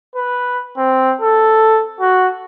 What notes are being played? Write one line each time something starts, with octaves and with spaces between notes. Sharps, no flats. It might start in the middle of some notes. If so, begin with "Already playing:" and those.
B4
C4
A4
F#4